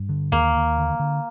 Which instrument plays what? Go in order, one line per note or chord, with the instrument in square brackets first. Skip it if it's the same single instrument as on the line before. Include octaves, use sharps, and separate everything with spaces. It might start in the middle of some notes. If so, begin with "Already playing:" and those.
Already playing: [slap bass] G2
D3
[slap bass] D#2 [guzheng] A#3
[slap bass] D#2
D3
D3